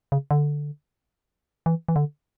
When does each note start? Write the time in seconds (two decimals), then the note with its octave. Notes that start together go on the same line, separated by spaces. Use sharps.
0.12 C#3
0.31 D3
1.66 E3
1.89 E3
1.96 D3